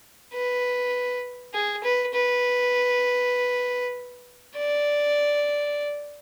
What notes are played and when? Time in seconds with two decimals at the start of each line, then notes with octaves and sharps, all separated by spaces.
0.33 B4
1.54 G#4
1.84 B4
2.14 B4
4.56 D5